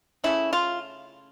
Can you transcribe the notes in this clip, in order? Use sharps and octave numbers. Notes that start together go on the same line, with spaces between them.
C#3 F3 A3 C#4 E4
F4